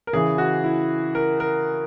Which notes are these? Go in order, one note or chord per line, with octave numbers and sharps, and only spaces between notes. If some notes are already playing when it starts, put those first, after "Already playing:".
A#4
C#3 E3 G#4
F#4
E4
A#4
A#4